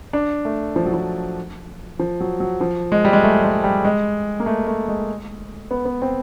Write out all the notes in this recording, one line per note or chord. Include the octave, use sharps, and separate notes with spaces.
D4
A3
F3
F#3
F3
F3
F#3
F#3
F3
G#3
G3
G#3
A3
G#3
G3
G#3
A#3
A3
A3
G#3
B3
B3
C4